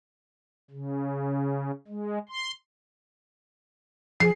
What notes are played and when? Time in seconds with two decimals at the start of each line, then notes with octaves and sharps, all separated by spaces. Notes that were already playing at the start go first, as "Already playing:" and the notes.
0.71 C#3
1.87 G#3
2.29 C6
4.20 F3 G#4 C7